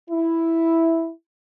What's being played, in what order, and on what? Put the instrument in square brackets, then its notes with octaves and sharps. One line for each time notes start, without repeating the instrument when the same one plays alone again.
[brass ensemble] E4